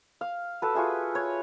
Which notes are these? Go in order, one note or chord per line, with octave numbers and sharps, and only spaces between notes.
F5
F#4 A4 B4
F4 F#4 G#4 E5
C#5